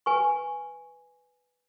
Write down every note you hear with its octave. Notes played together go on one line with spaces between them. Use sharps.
B4 G#5 C#6